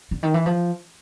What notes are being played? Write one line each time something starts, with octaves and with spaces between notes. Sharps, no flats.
D3
D#3
E3
F3